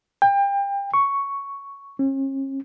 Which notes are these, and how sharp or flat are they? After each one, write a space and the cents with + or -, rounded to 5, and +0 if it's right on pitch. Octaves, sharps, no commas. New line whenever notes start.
G5 +30
C#6 +5
C#4 -40